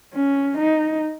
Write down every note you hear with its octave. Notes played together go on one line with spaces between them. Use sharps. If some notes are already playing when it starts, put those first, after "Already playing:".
C#4
D#4